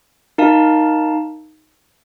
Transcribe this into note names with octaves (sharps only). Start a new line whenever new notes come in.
D#4 A#4 F5 A5